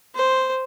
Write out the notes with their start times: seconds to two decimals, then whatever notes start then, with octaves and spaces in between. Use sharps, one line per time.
0.15 C5